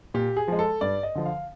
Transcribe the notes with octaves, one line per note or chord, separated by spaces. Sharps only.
A#2 G4
G#4
F3 G#3
A4
G2 D5
D#5
D3 F3
F5